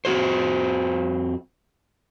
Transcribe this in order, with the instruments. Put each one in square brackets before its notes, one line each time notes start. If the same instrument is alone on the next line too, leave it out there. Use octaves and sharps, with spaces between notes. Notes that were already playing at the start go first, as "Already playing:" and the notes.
[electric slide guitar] F2 C4 F#4 G#4 C5